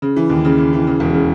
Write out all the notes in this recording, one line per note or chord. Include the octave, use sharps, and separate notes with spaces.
C#3
E3
D#2
C#3
C#3
E3
C#3
E1
C#3